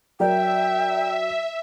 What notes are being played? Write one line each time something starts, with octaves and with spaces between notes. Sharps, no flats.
F#3 A#4 D5 E5 G5